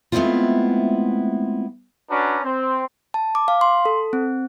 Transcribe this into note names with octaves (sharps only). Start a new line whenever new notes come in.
G#3 A3 B3 C4 E4 F4
C#4 D4 F#4 B4 D5 A#5
C4 C5
A5
D6
F5
C6
A4
C4